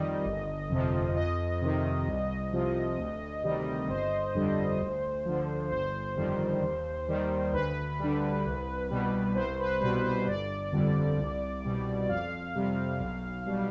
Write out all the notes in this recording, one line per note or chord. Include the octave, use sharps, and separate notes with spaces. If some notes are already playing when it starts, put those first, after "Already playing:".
Already playing: F2 D#3 G3 D#5
G1
F2 C3 F3
F2 D#5
C3 D#3
C2
C3 F3
D2
C3 D#3 G3
G1 C5
F2 D3 G3
D2
D3 F3
G1 C5
F2 D#3 G3
D#2
D#3 G3
D2 B4
D3 G3
C2
B2 G3
C2 C5
B4
B2 G3 B4
C5
G1 D5
F2 D3 G3
C2
B2 G3
F2 F5
C3 G3
B1
B2 G3